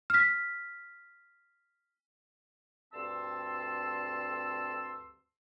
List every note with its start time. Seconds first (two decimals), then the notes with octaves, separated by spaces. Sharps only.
0.10 F6 B6
2.93 D2 G2 C4 A5 C6 E6